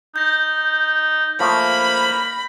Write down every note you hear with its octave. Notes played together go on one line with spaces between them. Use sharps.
D#4 G6 A#6
F3 A3 A#3 B5